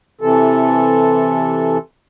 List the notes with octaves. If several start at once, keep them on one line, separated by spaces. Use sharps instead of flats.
C3 E3 A4